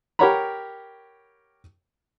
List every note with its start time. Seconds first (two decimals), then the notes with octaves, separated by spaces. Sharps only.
0.19 G4 A#4 C#5 F#5 A#5 B5